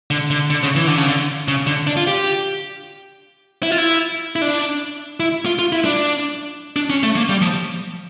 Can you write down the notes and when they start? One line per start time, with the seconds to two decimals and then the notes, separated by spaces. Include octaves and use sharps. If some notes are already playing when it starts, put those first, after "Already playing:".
0.11 D3
0.31 D3
0.50 D3
0.63 C#3
0.76 E3
0.87 D3
0.97 C#3
1.08 D3
1.48 C#3
1.67 D3
1.87 D4
1.97 F4
2.07 G4
3.63 E4
3.71 F4
3.78 E4
4.36 E4
4.42 D4
5.20 E4
5.46 F4
5.59 F4
5.72 E4
5.85 D4
6.76 D4
6.90 C#4
7.03 A3
7.16 A#3
7.29 G3
7.41 F3